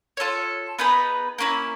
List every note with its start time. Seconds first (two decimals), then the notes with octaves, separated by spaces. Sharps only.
0.17 F4 A4 C#5
0.79 B3 D#4 G#4 B4
1.38 A#3 C#4 E4